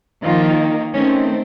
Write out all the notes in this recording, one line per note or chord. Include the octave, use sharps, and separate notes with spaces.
D#3 F3 A#3 F4
D#3 A3 C4 C#4